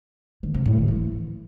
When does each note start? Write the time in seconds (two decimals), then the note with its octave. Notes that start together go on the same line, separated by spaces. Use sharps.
0.43 D#3
0.54 C3
0.66 A2
0.77 D#3
0.88 E3